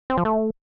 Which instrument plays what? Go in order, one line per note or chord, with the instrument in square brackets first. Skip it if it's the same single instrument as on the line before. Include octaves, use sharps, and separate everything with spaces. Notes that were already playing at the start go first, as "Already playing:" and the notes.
[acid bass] C4
F3
A3